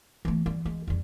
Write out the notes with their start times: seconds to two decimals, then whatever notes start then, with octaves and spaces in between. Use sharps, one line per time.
0.25 E3 A3
0.46 G3
0.65 G#3
0.87 F2 G3